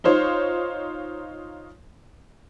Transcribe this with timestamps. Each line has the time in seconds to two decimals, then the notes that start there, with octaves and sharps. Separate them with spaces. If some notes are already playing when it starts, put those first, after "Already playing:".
0.04 D#4 F4 C5 C#5